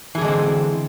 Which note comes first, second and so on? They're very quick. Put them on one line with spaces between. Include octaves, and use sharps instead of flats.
E3 G#4 D3 G#3 C4